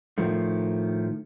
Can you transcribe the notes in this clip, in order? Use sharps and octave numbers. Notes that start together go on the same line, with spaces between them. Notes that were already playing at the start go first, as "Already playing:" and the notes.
A2 D#3 F3 A3